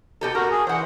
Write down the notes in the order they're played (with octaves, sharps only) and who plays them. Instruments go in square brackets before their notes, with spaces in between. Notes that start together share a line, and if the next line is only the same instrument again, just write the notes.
[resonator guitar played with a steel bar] B2 G4 A4
[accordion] F#4 [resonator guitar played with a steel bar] A#4
[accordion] G#4
[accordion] E3 [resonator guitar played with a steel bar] C5 F#5